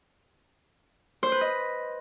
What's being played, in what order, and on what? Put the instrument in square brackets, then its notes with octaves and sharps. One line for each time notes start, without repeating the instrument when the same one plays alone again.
[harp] C5
B4
D#5